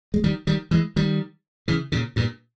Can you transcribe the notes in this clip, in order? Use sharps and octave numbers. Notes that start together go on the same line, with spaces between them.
G#3
D#3 G3
D#3 G3
E3 G#3
D#3 G3
C#3 E3
A#2 C#3
G2 A#2